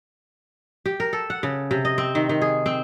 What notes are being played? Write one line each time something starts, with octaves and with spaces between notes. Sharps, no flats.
G4
A#4
A4
F#5
C#3
C3
D#5
C4
D#3
D#3
G#4
C4